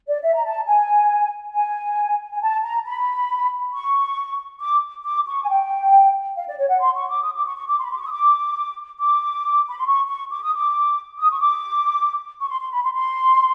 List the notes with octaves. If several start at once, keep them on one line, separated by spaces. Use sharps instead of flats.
D5
E5
A#5
A5
G#5
G#5
G#5
A5
A#5
B5
C#6
D6
D6
C#6
G#5
G5
F5
D5
C#5
F#5
C6
C#6
D6
D#6
D6
C#6
C#6
D6
C6
B5
C6
D6
C#6
D#6
D6
D6
B5
C6
C#6
C#6
D6
D#6
D6
D#6
C#6
D6
C#6
C6
C6
B5
C6
C6